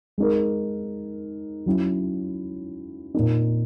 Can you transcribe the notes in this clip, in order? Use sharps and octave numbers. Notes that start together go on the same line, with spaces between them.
G#3 D#4 A#4
F#3 C#4 E4
A#2 A#3 D#4